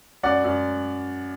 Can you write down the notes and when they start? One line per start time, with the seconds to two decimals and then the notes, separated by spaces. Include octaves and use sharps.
0.23 F#2 D5 F#5
0.44 F#2